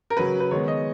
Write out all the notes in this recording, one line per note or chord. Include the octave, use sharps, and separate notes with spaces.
A#4
C#3 F#3 C#4 B4
B4
D#3 G#3 B3 C#5
D#5